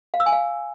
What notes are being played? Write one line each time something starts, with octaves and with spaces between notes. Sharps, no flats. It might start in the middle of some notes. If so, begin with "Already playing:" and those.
F5
E6
G#5
F5